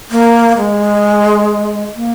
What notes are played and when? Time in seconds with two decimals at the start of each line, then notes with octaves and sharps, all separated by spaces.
0.11 A#3
0.57 G#3
1.96 A#3